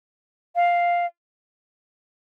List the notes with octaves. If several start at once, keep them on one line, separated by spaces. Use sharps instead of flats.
F5